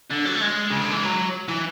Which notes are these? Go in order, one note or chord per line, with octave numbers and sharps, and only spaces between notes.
D3
F#3
A3
G#3
C#3
D3
E3
F#3
E3